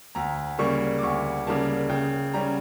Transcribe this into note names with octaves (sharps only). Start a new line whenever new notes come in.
D2 A#5
C#3 G3 A#3 C#6
D6
D2 C#6
C#3 G3 A#3 A5
C#3 G5
G3 C#4 A#5